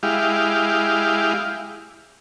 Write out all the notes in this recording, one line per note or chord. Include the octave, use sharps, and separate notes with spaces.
G#3 E4 G4 F5